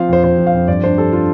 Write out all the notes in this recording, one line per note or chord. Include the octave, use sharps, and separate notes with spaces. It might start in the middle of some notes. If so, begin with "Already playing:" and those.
Already playing: F3 C4 F5
F2 C5
F2 C5
F3
F5
F2
G2 D5
D4 C5
G3 A4
D4 F4